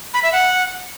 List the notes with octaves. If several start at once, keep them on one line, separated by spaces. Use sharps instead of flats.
B5
E5
F#5